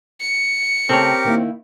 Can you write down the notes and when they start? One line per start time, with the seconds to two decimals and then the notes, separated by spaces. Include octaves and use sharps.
0.20 C#7
0.89 C#3 A3 C4 G4 A4 A#4 C#5
1.25 D#3 A#3 E4